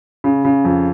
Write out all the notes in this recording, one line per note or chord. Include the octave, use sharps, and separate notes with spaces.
C#3
C#3
F2